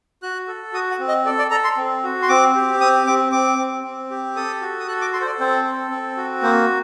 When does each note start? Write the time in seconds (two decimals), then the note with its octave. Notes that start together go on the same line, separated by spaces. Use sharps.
0.23 F#4 F#6
0.48 A4
0.73 F#4 D#6
0.91 F#5
0.99 C4
1.08 D#5
1.25 A4 D5
1.39 D5
1.51 A4 A#5
1.64 C6
1.77 C4
2.04 F#4
2.22 C6
2.29 C4 D6
2.55 G4
2.80 C4 D#6
3.07 C4 D6
3.32 C4 D6
3.59 C4
3.84 C4
4.11 G4
4.36 A4 D#6
4.61 F#4
4.80 D#6
4.88 A4 F#6
5.01 D6
5.13 A4 C6
5.21 C5
5.26 D5
5.40 C4 C5
5.65 A4
5.91 C4
6.17 F#4
6.43 A#3 C5